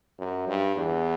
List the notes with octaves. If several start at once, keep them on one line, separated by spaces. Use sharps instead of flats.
F#2
G2
E2